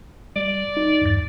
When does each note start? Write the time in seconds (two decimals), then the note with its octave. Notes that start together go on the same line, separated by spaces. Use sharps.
0.36 G3 D5
0.77 D#4
1.02 E2 G2 A6